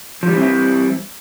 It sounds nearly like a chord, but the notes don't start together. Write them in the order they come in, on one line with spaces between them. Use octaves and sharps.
F3 G3 E3 C4 E4